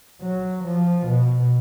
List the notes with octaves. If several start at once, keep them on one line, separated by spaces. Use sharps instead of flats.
F#3
F3
B2